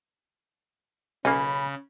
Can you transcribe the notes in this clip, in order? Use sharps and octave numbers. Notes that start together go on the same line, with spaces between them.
B1 C#3 A#3 C#4 B5